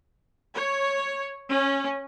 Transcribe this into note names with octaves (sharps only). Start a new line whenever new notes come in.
C#5
C#4